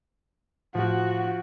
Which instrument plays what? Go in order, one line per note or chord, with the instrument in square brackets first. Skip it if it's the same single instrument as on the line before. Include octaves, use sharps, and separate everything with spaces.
[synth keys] A2 [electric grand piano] F3 [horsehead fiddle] F#4